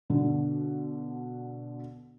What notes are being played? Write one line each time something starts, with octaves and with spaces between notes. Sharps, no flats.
B2 D3